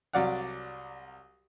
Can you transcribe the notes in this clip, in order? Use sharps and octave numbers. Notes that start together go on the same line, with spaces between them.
C2 F#3 D5 F5 F#5